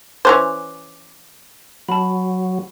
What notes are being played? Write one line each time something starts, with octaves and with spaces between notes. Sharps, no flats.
E3 C#4 C5 D6 F#6 F7
F#3 A5 B5